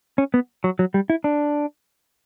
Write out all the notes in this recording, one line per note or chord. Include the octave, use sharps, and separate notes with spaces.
C#4
B3
F#3
F#3
G3
E4
D4